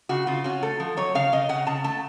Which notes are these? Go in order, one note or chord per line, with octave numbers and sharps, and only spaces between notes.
C#3 F#4
C#3 F4
C#4 F#4
A3 A4
F3
F#3 C#5
C#3 F5
C#3 D#5
C#3 F#5
C#3 A5
A3 A5